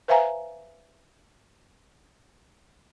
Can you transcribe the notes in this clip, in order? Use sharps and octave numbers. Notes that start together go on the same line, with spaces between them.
B4 C5 E5 F5 G#5 A#5